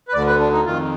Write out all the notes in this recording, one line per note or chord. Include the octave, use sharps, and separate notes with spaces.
B4
D2 D3 D5
B4
D4
D#4
F2 D#3 F4